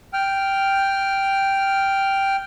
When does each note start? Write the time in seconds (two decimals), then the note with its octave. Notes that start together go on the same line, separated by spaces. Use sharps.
0.13 G5 F6